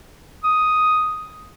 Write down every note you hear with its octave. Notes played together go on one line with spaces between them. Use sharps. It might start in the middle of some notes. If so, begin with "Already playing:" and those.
D#6